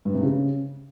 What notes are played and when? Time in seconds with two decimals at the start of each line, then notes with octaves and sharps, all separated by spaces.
0.05 G2
0.14 C3
0.23 C#3